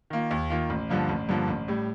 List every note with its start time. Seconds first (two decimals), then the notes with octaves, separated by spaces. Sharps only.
0.10 D#3 A#3 F4
0.31 D#2
0.50 D#3 A#3 F4
0.70 A1
0.89 G2 D3 F3 A#3
1.09 A1
1.29 G2 D3 F3 A#3
1.48 A1
1.68 A2 G3